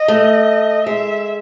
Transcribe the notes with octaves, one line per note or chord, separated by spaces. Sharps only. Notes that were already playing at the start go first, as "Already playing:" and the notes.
Already playing: D#5
A3
G#3 E5